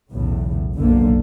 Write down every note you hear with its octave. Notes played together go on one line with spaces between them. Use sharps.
B1 E2 A2 C#3
F#1 B1 D3 A#3